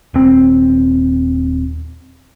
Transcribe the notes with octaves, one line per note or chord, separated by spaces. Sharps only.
D#1 C4